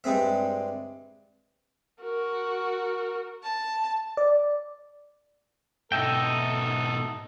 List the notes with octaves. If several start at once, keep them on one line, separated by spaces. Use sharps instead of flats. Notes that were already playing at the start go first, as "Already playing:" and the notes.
G2 G3 G#3 C4 E5
F#4 A#4
A5
D5
G#2 B2 D#4 A4 E5 G5